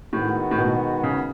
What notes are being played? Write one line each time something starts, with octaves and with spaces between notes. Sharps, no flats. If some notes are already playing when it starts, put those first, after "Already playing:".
A2 D#3 G#3 B3 F#4
A2
B2
C#3